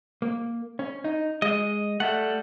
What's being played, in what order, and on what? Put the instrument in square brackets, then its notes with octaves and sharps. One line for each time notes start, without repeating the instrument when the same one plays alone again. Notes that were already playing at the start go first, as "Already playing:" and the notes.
[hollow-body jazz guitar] A#3
C#4
D#4
[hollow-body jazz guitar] G#3 [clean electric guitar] D#5
[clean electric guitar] G3 A4 F#5 [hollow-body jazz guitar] A3